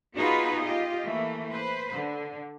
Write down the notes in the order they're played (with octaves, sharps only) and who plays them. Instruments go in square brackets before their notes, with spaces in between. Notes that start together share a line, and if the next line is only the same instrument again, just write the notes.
[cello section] B3 D#4 F4 F#4 G#4 B4
F4 G4 D#5
E3 A3 A#3
B4 C5
D3